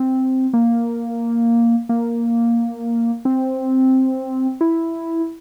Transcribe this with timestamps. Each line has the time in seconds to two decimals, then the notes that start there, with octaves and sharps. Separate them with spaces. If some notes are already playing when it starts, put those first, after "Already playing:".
Already playing: C4
0.53 A#3
1.89 A#3
3.25 C4
4.61 E4